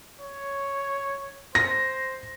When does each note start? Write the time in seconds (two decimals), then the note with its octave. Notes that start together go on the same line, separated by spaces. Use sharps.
0.21 C#5
1.55 C5 A#6